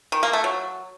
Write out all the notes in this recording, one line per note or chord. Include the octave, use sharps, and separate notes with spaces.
D#3
A#3
A3
F#3